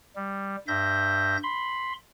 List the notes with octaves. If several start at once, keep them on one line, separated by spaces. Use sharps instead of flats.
G3
G2 E5 G6 A#6
B5 C6